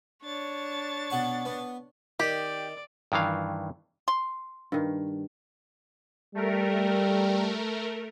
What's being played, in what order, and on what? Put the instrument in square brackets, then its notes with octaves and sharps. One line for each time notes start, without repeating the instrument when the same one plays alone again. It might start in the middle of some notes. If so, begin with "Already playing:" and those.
[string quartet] D4 C#5 A6
[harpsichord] B2 F#5 C#6
B3
[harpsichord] D#3 [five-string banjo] G4 [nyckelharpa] D5
[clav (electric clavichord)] G2 D#3 E3 F5
[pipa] C6
[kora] G2 D#3
[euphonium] G3 [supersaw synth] A3 A#4